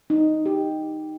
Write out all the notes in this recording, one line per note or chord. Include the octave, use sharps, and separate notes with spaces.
D#4
G4